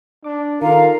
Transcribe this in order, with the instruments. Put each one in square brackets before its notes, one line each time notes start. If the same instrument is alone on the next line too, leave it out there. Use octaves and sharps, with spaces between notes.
[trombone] D4 [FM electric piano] D6
[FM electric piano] D#3 [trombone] F4 [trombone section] A4 A#4 [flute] F5